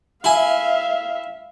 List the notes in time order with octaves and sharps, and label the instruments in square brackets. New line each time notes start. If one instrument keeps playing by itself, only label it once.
[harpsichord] E4 G#5 [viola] E5 F5